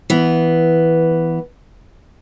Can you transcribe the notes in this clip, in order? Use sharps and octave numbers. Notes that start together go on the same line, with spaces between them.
E3 B3